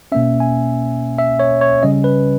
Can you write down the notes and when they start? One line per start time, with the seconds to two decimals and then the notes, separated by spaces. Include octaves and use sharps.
0.12 B2 A#3 C#4 E5
0.40 G#5
1.19 E5
1.39 C#5
1.61 C#5
1.83 C#3 G3 C#4 D#5
2.04 B4